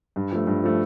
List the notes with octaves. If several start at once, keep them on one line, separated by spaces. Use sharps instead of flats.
G2
F3 A3
G2
F3 A3